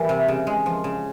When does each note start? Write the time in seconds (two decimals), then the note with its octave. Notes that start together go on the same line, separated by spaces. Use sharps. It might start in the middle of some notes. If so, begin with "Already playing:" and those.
Already playing: E3 G3 A#3
0.09 C3
0.28 C#3
0.47 G#3
0.66 F3
0.84 C#3